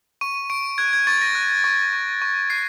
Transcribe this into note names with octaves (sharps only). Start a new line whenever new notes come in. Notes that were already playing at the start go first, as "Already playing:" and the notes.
C#6 D#7
C#6 D7
F#6 G#6
G#6
C#6 A6
A#6
F#6
C#6
C#6
C#6
F#6 C7